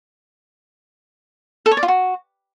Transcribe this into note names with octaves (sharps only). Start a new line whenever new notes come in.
A4
C#5
D5
F4
F#4